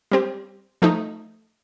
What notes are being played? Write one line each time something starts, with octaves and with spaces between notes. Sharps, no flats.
G3 C4 G4
F3 A3 D#4